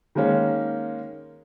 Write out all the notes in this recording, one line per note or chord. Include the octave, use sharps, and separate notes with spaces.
D#3 G#3 A#3 C#4